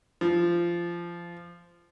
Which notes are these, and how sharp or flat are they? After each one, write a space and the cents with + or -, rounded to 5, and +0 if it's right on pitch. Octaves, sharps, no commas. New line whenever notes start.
F3 -20